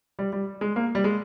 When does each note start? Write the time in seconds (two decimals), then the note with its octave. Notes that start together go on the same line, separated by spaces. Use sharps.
0.19 G3
0.33 G3
0.61 G#3
0.76 A#3
0.95 G3
1.04 G#3